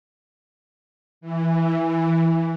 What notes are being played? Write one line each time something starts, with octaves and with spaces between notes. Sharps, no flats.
E3